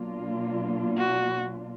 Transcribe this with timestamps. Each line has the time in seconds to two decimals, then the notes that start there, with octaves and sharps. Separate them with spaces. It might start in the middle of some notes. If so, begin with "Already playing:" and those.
Already playing: B2 F#3 A#3 D4 F4
0.98 F#4